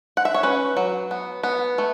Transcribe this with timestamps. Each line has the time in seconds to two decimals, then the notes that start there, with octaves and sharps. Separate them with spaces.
0.17 F#5
0.25 E5
0.34 C#5
0.43 C#4 B4
0.77 F#3
1.11 B3
1.43 B3
1.78 A3